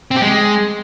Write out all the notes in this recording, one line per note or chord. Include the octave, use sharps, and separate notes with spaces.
C4
G4
G#3